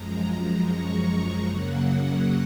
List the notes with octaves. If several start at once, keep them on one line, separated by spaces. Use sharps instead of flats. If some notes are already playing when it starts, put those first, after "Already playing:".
Already playing: F#2 F3 G#3 A#5
C#6
F#2 C#3 F#3 A#3 F#5